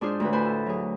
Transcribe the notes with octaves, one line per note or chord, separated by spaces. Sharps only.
G#2 D4 F4 G#4 C5 C6
D2 A2 B4
A2 B4 C5 G#5 B5
A4
F#3 G#4